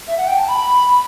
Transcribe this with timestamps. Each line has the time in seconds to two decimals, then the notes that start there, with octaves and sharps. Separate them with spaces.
0.07 E5
0.17 F#5
0.27 G5
0.38 A5
0.48 B5